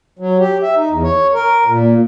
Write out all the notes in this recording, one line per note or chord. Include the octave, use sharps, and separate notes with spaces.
F#3
G4
E5
D#4
E2
C#5
A#4
A#2